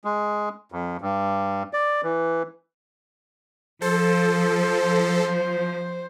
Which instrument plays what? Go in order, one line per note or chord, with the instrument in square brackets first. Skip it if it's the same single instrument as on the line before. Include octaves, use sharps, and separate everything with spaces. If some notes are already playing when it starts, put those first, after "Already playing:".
[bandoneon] G#3
F2
G2
D5
E3
[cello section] F3 [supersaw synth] A4 [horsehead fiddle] C5